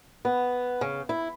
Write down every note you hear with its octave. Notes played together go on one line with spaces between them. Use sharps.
B3
C#3
E4